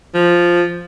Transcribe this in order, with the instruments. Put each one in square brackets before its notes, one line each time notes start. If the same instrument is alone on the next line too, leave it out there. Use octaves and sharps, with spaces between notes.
[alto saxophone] F3